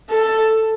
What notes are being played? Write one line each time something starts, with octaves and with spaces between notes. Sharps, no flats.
A4